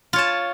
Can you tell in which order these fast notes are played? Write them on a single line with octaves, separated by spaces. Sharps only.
F4 C#5 A5